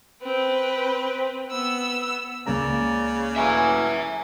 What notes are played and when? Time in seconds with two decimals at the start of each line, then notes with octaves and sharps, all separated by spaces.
0.23 C4 B4
1.50 B3 E6
2.47 C#2 C#3 A#3 D5 A#5
3.36 A2 F#3 C#4 E5 G#5